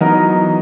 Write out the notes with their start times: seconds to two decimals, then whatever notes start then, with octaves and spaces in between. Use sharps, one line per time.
0.01 E3 F#3 B3 D#4 A#4
0.19 E3
0.37 E3